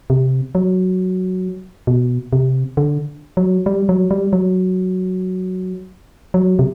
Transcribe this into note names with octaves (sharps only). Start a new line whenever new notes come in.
C3
F#3
B2
C3
D3
F#3
G3
F#3
G3
F#3
F#3
C3